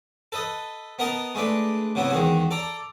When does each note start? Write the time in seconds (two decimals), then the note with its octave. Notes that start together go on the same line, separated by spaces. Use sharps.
0.32 A4 B4 D#5
0.99 B3 A#4 D#5 A5 A#5
1.35 G#3 A3 D4 B4
1.95 C3 F#3 B3 E4
2.10 E2 D#3 G#3 F#4
2.51 A4 D5 A#5